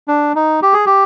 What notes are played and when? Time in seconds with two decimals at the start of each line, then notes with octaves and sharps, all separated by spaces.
0.08 D4
0.35 D#4
0.62 G4
0.73 G#4
0.86 G4